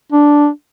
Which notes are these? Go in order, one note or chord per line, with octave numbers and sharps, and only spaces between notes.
D4